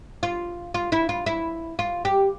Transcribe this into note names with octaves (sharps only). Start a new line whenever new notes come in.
F4
F4
E4
F4
E4
F4
G4